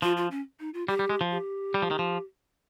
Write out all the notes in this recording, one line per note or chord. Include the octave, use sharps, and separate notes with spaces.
F3 F4
F4
C#4
D#4
F4
G3 G4
G3
G#3
F3
G4
G3
F3
D#3
F3